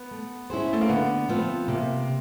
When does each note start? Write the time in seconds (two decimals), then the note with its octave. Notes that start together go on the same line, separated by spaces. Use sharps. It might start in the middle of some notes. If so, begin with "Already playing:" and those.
Already playing: B3
0.11 A3
0.50 C#4 E4 G#4 C5
0.73 A3
0.81 A#3
0.89 D3 B3
1.29 F3 A3 B3 C4 F4
1.68 C3 A#3